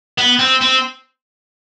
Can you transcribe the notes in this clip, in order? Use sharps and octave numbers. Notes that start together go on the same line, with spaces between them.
B3
C4
C4